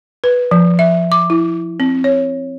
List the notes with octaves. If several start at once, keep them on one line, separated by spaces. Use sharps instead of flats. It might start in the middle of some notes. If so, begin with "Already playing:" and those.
B4
F3
E5
D6
E4
C4
C#5